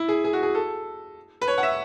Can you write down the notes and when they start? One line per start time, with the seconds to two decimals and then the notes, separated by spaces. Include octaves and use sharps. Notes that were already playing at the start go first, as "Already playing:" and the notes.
Already playing: E4
0.08 G#4
0.24 G#4
0.33 F#4
0.43 G#4
0.55 A4
1.42 B4
1.48 C#5
1.58 F#5
1.63 E5